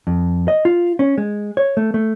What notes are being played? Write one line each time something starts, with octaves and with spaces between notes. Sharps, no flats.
F2
D#5
F4
C#4
G#3
C#5
A3
A3